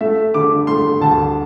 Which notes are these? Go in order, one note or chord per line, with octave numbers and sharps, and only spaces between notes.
A3 E5
D3 D6
A3 C6
D2 A5